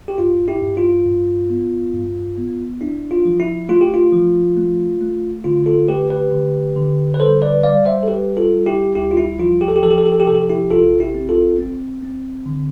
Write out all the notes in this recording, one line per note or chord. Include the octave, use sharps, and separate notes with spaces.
G4
G2 F4
E4 G4
G2
F4
G2
B3
G2
B3
D4 E4
F4
F3
E4
A3 F4
G4
F4
F3
A3
A3
D3 F4
F4 A4
A3 G4 B4
G4 B4
D3
D3
B4
G3 A4 C5
B4 D5
G3 D5 F5
C5 E5
A4
G3 G4 B4
F4 A4
G3
E4 G4
D2 E4 G4
F4
E4
F3 F4
G4
A4
G4
F3 A4
G4
A4
G4
A4
G4
C3 A4
G4
A4
E4 G4
A1 F4 A4
E4 G4
C4
F4 A4
C4
C4
D3